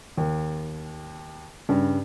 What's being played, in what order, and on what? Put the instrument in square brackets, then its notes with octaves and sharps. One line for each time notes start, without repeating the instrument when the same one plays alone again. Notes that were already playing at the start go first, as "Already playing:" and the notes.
[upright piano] D#2
G2 C#3